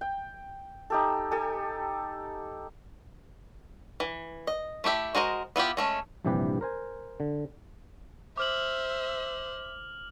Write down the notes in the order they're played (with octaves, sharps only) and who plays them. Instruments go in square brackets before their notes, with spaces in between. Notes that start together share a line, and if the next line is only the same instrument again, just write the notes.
[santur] G5
D#4 G4 A4
G4 A4 G#5
[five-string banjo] E3
D#5
A3 E4 G4 E5
G#3 F#4 A#4 C5 D#5
B3 E4 F4 G4
G#3 A3 C#4
[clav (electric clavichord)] A#1 G2 C3 E3 G4 B4
A#4 C5 G#5
D3
[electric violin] C5 [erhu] E5 [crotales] D6 F6 F#7